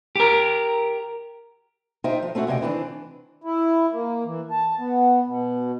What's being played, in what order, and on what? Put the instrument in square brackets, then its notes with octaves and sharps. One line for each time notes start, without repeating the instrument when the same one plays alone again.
[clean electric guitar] G4 A#4
[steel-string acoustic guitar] D#4 F4 C5 D#5 E5 G5
F3
A3 C4 C#4 F#4 E5
D2 C3 A#4 D#5 G5
D#3 E3 C4 D4
[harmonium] E4
A#3
E3
A5
B3
B2